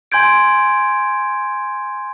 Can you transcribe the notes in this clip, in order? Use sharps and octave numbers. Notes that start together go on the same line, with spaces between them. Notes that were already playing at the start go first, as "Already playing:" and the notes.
G#5 C6 G6 G#6 D7